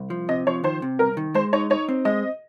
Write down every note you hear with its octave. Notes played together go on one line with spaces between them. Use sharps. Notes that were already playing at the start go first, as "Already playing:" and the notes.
Already playing: C2
F3
C3 D#5
F3 C#5
D#3 C5
C3
C2 A#4
D#3
G#3 C5
D#4 C#5
D#4 C#5
C4
G#3 D#5